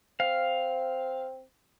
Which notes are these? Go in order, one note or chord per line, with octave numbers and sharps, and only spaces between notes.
C4 F5